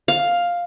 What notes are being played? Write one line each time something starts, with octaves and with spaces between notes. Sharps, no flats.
F5